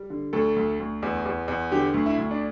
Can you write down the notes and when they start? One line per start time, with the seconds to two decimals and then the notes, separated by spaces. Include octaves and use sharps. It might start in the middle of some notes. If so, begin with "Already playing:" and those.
Already playing: G3
0.10 D3
0.33 D2 A4
0.56 D2
0.80 D2
1.03 E2
1.25 E2
1.48 E2
1.71 D3 G4
1.94 D2
2.06 E4
2.18 D2
2.31 D4